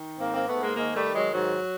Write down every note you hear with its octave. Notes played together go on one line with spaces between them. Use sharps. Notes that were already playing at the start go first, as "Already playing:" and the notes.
Already playing: D#3
G#2 A#3 C4
A#3 C4
G#2 A3 B3
G#3 A#3
D#3 G#3 A#3
G3 A3
D#3
F#3 G#3
G#2 F#3